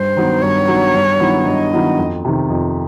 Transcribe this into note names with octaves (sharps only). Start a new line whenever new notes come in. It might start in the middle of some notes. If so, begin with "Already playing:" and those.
Already playing: G2 C5
D#3 F#3 B3
G2 C#5
D#3 F#3 B3
G2
D#3 F#3 B3 E4
G2 D#5
D#3 F#3 B3 E4
F2
C3 D#3
F2